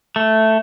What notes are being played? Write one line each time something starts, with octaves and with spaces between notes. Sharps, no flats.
A3